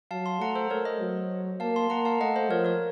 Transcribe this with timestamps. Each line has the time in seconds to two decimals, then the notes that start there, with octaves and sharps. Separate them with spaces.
0.11 F#3 F5 A5
0.26 A5 C6
0.40 A3 F#5 A#5
0.55 A4 C5
0.70 A3 A#4 C#5
0.85 C5 D#5
1.00 F#3
1.60 A#3 F5 A5
1.76 A5 C6
1.90 A#3 F#5 A#5
2.05 F5 A5
2.21 A3 D#5 F#5
2.36 C5 D#5
2.50 F3 A#4 C#5
2.65 A#4 C#5